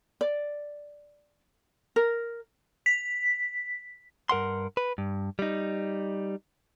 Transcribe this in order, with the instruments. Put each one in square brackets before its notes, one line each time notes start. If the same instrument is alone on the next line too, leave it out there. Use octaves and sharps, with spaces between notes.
[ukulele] D5
A#4
[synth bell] B6
[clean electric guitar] G2 A#4 F#5 C6
B4
G2
G3 D#4